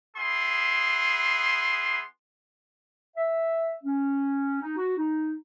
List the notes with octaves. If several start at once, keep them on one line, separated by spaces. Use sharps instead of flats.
B3 E4 G#4 C6
E5
C#4
D#4
F#4
D#4